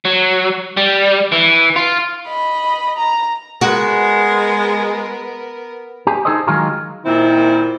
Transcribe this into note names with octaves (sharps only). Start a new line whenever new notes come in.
F#3
G3
E3
F4
D#5 B5
A#5
G#3 B3 F#4 A#4
G4 G#4
D#4 E4 G#4 A4 C5 D#5
D#3 F#3 G#3 F4 G#4 A#4
A#2 D#3 C4 E4